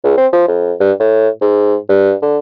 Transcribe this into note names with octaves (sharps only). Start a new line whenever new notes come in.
C#2
C4
F3
F2
G2
A2
G#2
G2
D3